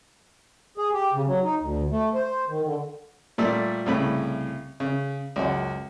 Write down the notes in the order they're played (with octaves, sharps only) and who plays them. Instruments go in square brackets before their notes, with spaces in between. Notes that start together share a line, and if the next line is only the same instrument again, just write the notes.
[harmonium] G#4
G4
C#3
F#3
D#4
D2
A3
C5
D#3
D3
[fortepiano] A#2 G3 A3 E6
C2 A2 C#3 B5
C#3
C#2 F#2 F#4